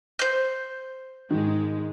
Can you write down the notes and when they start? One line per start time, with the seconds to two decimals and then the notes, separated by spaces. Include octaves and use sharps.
0.19 C5 G6
1.31 G#2 D#3 G#3